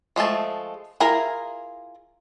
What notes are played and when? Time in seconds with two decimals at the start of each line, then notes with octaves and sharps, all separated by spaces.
0.16 F3 G#3 A3 A5
1.00 E4 F4 G#4 A#4 A#5